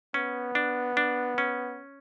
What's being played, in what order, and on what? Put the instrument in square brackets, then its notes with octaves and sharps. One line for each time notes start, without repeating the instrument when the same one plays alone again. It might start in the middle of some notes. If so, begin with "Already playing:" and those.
[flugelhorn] B3 [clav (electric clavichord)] C#4
[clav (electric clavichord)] D4
D4
C#4